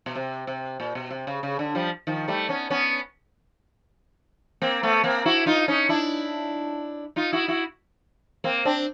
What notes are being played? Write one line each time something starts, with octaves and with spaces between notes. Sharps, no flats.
B2
C3
C3
A#2
B2
C3
C#3
C#3
D3
F3 G3
D#3 F3
G3 A3
B3 C#4
B3 C#4
A#3 C4
A3 B3
A#3 C4
E4 F#4
D#4 F4
C#4 D#4
D4 E4
D#4 F4
E4 F#4
E4 F#4
A#3 C4
C4 D4